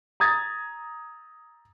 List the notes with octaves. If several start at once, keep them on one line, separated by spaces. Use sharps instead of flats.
A#5 D#6 G#6 A6